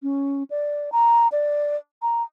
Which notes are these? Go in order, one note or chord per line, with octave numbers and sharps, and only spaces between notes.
C#4
D5
A#5
D5
A#5